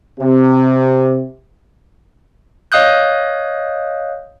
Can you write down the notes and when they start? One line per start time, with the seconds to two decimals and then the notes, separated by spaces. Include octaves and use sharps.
0.20 C3
2.72 C#5 D#5 F5 D#6 F#6 G6